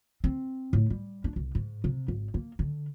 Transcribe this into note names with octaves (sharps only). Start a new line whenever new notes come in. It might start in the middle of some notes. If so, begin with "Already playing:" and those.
C4
A2
G3
D4
C2
G#2
C3
G#1
A#3
D3